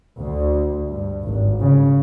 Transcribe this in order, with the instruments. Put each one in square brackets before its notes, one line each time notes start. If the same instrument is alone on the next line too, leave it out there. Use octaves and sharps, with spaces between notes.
[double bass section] D2
G2
G#1
C#3